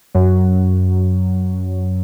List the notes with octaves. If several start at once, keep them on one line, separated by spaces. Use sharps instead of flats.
F#2 F#3